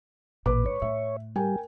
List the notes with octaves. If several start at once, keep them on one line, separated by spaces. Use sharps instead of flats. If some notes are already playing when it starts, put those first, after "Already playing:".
A1 A#2 B4 D6
G#2 C#5
A2 E5
G3 A#4 G5 G#5